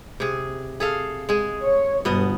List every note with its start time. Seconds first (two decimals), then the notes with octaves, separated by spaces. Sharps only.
0.20 C3 G#4
0.80 G#4 A4 F5
1.29 G#3 G#4
1.62 C#5
2.05 G1 B2 B3 D#5